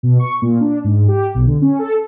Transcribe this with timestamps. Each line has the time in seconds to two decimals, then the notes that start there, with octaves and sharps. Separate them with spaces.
0.03 B2
0.19 C#6
0.42 A#2
0.61 D4
0.84 G#2
1.08 G4
1.35 B1
1.47 D3
1.62 C#4
1.79 A4